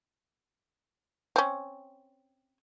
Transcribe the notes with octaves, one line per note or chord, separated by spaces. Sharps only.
C4 C#4